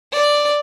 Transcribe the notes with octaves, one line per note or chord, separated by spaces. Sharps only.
D5